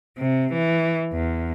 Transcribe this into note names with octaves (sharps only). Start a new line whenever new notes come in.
C3
E3
E2